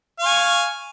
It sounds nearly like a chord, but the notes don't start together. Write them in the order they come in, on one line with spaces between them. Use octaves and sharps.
F5 C#6 G#5